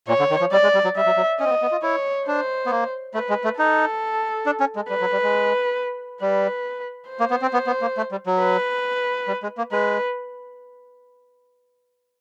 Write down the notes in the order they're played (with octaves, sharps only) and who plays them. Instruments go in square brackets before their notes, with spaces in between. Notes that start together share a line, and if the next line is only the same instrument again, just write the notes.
[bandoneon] A#2 [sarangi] C#5
[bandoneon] D3
D#3
F3
[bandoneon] G3 [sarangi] D5
[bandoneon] G#3
G3
F#3
[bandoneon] G3 [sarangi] E5
[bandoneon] F#3
F#3
[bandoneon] C#4 [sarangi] D#5
[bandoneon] C4
B3
B3
F4
[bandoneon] E4 [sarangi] C#5
[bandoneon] D4 [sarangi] C5
[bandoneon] B3
A#3
[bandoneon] A3 [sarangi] B4
[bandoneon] G#3
A3
[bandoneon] D#4 [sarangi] A4
[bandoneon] D4
C#4
G#3
[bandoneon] G3 [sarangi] B4
[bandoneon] F#3
G3
G#3
[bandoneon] G3 [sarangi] B4
[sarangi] C5
[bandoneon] A#3
B3
C4
B3
B3
A#3
A3
G3
F#3
[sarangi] B4
[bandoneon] G3
G#3
A#3
[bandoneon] G#3 [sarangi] B4